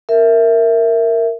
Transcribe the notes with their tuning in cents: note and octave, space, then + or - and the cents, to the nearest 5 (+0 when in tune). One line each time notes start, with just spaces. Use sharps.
A#4 -10 E5 +0